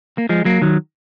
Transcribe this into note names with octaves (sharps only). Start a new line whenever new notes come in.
A#3
F3 G#3
F#3 A#3
D#3 F#3